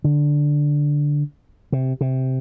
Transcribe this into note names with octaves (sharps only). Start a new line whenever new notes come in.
D3
C3
C3